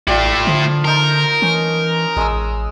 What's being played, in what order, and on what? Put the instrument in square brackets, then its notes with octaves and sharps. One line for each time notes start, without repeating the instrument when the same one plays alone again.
[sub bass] A1 [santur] G3 F4 [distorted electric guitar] A3 E4
[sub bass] D3 [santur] F3
[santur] D#4 A5 [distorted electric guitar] A#4
[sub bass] E3 [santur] C#4
[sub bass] A1 [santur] G#3 D#6 E6